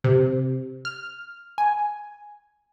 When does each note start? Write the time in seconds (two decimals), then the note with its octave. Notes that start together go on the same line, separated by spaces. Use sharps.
0.04 C3
0.85 F6
1.58 G#5